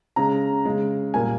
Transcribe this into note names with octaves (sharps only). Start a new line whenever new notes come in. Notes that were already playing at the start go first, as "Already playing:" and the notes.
C#3 G#3 A#5
C#3 G#3
A#2 G3 A#3 G#5